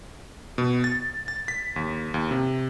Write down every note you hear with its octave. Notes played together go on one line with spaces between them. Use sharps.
B2
A6
A6
B6
D#2
D#2
C3